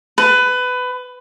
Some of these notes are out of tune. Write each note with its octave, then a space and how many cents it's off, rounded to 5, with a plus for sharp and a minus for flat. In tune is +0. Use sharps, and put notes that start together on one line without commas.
B4 +20